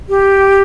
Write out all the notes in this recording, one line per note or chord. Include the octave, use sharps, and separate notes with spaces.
G4